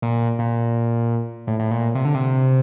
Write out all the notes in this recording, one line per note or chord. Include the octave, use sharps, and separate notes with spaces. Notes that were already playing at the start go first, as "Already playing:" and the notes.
A#2
A#2
A2
A2
A#2
C3
D3
C3